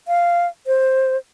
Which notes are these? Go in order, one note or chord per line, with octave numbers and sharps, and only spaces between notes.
F5
C5